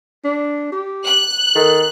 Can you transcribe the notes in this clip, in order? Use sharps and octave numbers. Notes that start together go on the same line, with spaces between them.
D4
G4
F#6
D#3 A4